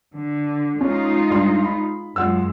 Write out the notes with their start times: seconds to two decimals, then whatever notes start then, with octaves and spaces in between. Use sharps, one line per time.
0.15 D3
0.81 G#3 C#4 D#4 F4
1.31 G2 C6
1.65 B5
2.16 F#2 G#3 F4 F#5 E6